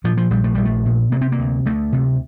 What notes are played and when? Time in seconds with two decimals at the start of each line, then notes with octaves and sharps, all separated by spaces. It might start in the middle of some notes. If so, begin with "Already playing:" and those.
0.04 A#2 F3
0.17 F3
0.30 A#1 G3
0.44 A3
0.55 A#1 G3
0.65 A3
0.85 A#2
1.12 C3 A#3
1.21 C4
1.32 A#3
1.39 D2
1.66 D2 A3
1.92 C3